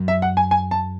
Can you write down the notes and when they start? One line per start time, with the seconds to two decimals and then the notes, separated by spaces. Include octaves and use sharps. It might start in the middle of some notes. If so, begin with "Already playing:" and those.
Already playing: F#2
0.08 E5
0.22 F#5
0.37 G#5
0.51 G#5
0.71 A5